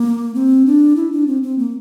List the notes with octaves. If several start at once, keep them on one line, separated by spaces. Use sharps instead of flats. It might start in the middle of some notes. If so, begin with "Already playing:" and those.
Already playing: A#3
C4
D4
E4
D4
C4
C4
A#3